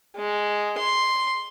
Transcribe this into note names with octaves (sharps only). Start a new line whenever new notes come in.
G#3
C6